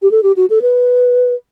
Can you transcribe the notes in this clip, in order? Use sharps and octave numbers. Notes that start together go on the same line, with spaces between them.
G4
A4
G4
F#4
A4
B4